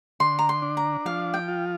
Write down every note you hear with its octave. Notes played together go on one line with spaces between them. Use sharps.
D3 C6
A#5
C6
D4
A#5
F3 F5
G5
F4